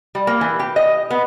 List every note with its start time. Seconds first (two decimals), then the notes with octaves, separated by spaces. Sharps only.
0.15 G3
0.27 A#3
0.41 E3
0.60 G4
0.76 D#5
1.11 B3